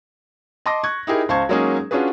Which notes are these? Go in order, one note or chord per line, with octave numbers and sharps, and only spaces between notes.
D#5 A5 C6 D6 A#6
C#6 F#6 G#6
D#4 E4 G4 G#4 A#4
C#2 C5 F5 A5 C#6 G#6
F#3 G#3 A#3 C#4 D#4 G#4
C#4 D4 F4 F#4 G#4 B4